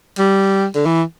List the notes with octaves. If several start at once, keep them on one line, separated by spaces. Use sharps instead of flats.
G3
D3
E3